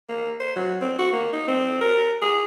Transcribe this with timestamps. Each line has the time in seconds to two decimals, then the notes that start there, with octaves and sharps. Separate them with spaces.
0.09 A#3
0.40 C5
0.56 F#3
0.81 C4
0.99 F#4
1.12 A#3
1.33 D#4
1.48 C4
1.81 A#4
2.22 G#4